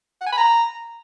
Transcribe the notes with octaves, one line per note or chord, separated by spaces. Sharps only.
F#5
G#5
B5
A#5